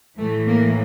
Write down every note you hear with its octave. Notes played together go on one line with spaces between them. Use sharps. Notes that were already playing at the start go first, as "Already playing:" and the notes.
A2 E3 A3
A#3